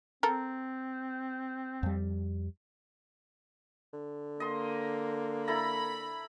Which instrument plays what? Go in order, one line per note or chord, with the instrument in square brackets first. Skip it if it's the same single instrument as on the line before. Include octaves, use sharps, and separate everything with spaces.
[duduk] C4 [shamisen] A4 A#4
[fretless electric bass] F2 G3
[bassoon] D3
[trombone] A#3 [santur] D#5 C6
[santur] E4 A4 A#5 [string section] B5